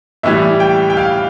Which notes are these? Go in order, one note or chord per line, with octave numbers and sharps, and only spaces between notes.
A2 E3 G3 E5
G5
G5
F5